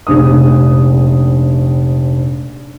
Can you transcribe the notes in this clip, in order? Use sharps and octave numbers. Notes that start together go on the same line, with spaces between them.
F1 A#1 D#6